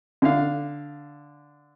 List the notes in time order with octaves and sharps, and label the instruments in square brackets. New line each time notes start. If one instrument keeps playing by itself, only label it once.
[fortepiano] D3 F5